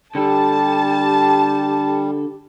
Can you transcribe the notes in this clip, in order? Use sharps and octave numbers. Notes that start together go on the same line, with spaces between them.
D3 G3 G4 A4 A5